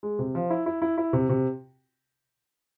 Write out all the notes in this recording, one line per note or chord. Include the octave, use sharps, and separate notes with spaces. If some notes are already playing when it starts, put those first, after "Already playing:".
G#3
C3
F3
E4
E4
E4
E4
C3
C3